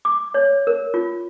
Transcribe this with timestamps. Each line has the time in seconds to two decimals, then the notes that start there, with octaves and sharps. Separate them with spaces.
0.05 D6
0.34 C#5
0.67 A#4
0.94 F4